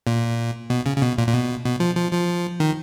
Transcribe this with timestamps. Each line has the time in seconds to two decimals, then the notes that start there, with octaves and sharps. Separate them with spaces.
0.07 A#2
0.70 B2
0.86 C#3
0.97 C#3
1.02 B2
1.18 A#2
1.28 A#2
1.33 B2
1.65 B2
1.80 F3
1.97 F3
2.13 F3
2.60 D#3